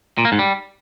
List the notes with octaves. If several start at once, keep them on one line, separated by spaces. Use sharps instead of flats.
A#2
A#3
G#2
G3